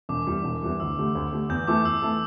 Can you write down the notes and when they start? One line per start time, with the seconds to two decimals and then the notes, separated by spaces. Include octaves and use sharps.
0.09 E1 D6
0.27 E2 E3 G3
0.44 E1
0.62 E2 E3 G3
0.80 D2 E6
0.97 D3 A3 G4
1.15 D2
1.32 D3 A3 G4
1.49 E2 G6
1.67 E3 A3 E4 A4 D6
1.85 E2 E6
2.02 E3 A3 E4 A4